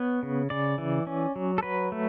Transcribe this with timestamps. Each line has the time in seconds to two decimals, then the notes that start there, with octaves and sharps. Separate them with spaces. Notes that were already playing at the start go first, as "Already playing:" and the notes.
Already playing: B3 C#5
0.23 C#3
0.50 C#3 D5
0.78 E3
1.07 C#4
1.36 F#3
1.58 A4
1.63 F#3 B4
1.92 A3